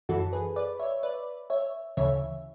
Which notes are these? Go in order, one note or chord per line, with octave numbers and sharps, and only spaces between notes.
F#2 E3 F#4 A4
G#4 B4
B4 D5
C#5 E5
B4 D5
C#5 E5
D2 C#3 E3 C#5 E5